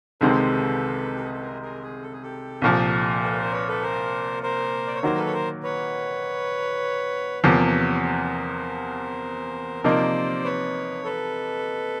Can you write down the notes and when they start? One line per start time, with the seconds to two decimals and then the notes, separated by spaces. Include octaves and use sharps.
0.21 C2 C3 D#3 G#3 C4 A4 B4
1.16 G4
1.25 G#4
1.33 A4
1.41 G#4 A#4
1.61 G#4 A#4
1.82 G#4
2.02 A4
2.12 G#4
2.23 G4 A4
2.62 C2 A#2 F3
3.22 A4 B4
3.33 B4
3.37 A#4 C5
3.52 B4 C#5
3.68 A4 B4
3.82 A#4 C5
4.43 A#4 C5
4.87 D5
4.95 C#5
5.03 D#3 F#3 A#3 A#4 C5
5.17 A4 B4
5.26 C#5
5.33 A#4 C5
5.63 B4 C#5
7.43 E2 C3 F3 A#3 C#5
7.54 D5
7.65 B4 C#5
7.93 B4
8.03 A#4 C5
9.84 C3 F3 A#3 D#4 C5 D5
10.45 B4 C#5
11.04 A4 B4